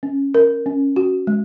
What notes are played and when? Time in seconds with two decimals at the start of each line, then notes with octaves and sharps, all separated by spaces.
0.03 C#4
0.35 A#4
0.66 C#4
0.96 F#4
1.27 G#3